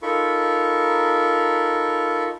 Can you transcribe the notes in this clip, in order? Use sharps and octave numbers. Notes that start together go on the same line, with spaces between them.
D#4 F4 A4 A#4 B5 C#6